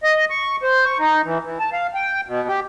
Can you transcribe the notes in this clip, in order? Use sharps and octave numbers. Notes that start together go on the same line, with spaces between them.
D#5
C#6
C5
C#6
D#4
E3
E3
A5
F5
G5
B2
G4